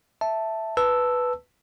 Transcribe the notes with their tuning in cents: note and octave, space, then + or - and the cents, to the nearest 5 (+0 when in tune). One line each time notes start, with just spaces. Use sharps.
E5 +0 A5 +0
B4 +0 A5 +0 E6 +0